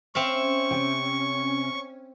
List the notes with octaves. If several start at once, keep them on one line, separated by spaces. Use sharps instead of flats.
C4 C#4 E5 F5 C#6
C3 G5